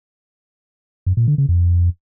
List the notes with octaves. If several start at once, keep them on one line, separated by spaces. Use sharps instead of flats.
F#2
A#2
D3
C#3
F2